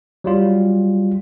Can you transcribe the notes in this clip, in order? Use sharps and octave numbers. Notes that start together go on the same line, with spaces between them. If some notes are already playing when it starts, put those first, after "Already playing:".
F#3 G3 F4